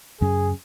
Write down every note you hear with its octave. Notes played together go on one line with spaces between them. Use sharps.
F#2 C#3 F#3 C#4 G#4